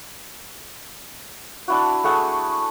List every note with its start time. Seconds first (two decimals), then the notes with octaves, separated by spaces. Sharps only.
1.68 D4 E4 F#4
2.04 A3 G#4 F#5 E6